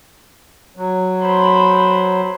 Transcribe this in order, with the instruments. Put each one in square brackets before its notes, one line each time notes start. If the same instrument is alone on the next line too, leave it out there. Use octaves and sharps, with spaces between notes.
[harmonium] F#3
[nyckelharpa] C5 B5